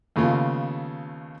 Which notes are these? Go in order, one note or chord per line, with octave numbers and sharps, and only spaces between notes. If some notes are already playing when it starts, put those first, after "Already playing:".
D#2 C#3 A3 B3 F4